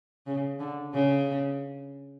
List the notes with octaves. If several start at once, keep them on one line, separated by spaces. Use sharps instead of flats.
C#3
D3
C#3